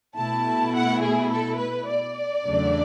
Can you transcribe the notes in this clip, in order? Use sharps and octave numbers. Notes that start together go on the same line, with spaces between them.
B2 A3 E4 A5
F#5
G#4
A4
B4
D5
E2 C#3 F#3 A3 D4